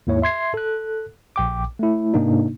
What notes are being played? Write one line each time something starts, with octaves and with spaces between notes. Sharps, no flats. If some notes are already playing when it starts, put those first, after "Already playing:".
D#2 G#2 A#3 E4 C#5
E5 C6 G#6 C7
A4 F#6
A#1 G5 D6
A3 E4
G#2 C3 A#3 D4 D#4